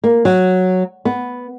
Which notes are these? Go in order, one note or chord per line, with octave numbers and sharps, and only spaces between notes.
A#3
F#3
B3